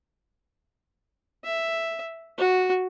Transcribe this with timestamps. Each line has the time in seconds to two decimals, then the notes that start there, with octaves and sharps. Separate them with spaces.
1.44 E5
2.38 F#4